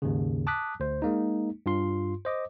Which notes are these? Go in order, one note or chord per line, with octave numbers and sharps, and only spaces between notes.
D#2 G#2 C#3
A5 D6 D#6 F#6 B6
D2 C5
G#3 A#3 D#4
G2 F4 C6
C5 D#5 D6